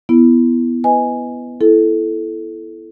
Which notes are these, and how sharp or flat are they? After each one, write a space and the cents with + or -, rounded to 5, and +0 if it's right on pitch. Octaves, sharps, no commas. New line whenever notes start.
B3 +0 E4 +15
B4 +20 D#5 +10 G#5 +0
E4 +15 A4 -15